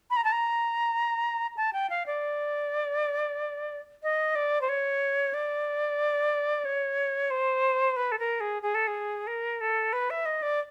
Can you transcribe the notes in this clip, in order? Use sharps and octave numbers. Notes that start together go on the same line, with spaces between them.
B5
A#5
A5
A#5
A5
G5
F5
D5
D#5
D5
C5
C#5
D5
C#5
C5
B4
A4
A#4
G#4
G#4
A4
G#4
A#4
A4
B4
E5
D#5
D5